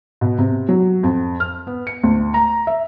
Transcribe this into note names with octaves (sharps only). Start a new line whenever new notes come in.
B2
C3
F#3
F2
F6
B3
C#7
D2
A#5
E5